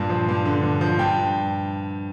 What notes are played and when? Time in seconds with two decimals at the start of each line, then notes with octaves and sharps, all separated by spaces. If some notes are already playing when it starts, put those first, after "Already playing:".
Already playing: G2 A#2
0.10 F3
0.28 G2
0.45 D3
0.63 G2
0.81 F3
0.99 G2 G5